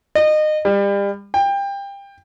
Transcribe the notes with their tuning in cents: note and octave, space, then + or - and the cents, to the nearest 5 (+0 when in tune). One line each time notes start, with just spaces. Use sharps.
D#5 -25
G3 +35
G5 +25